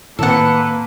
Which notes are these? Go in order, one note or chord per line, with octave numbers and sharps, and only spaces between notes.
A2 D#3 A#3 C4 A4 B4 F#5